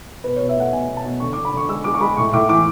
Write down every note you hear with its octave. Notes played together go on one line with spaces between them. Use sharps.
B2 B4
B2 C#5
E5
A3 F#5
B2 G#5
B2
A5
B2
D3 C#6
D3 D6
B5
D3 C#6
G#3 E6
G#3 D6
C#6
G#3 B5
A2 C#6
A2 D6
E3 D6